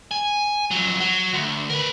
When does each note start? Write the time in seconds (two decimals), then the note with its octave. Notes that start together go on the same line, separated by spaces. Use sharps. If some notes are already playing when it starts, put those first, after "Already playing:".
0.11 G#5
0.71 F2 F#3
1.00 F#3
1.34 D2
1.70 A#4 B4